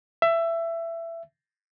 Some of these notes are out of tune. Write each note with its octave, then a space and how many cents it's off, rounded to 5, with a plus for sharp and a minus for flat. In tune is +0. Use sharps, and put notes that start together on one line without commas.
E5 +20